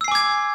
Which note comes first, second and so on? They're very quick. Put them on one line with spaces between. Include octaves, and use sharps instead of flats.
E6 C7 G#5 D6 G#6